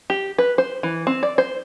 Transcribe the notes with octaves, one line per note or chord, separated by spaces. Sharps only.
G4
B4
C5
E3
C4
D5
C5